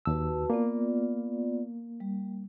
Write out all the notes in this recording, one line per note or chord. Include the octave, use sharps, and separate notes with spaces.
D#2 F#4 B4 A5 E6
A#3 B3 F4 D5
G3